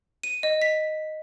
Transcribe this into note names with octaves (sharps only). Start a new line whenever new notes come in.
D#7
D#5
B6